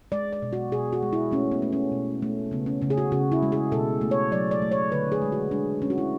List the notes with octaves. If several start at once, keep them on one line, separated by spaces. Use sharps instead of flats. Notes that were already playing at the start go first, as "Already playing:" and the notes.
G#3 D5
D5
B2
F#4
B2 G#4
F#4
G#3
E4
A3 C#4
B3
A3
C#4
B2
A3
C#3 B3
C#4
C#3 C#4
G#4
F#4
C#3 F#4
E4
G#3
G#4
B2 A4
A3
C#5
F#3 D5
D5
A3
C#5
D3 B4
G#4
G#3
F#4
G#3 D4
G#3 C#4
F#4
E4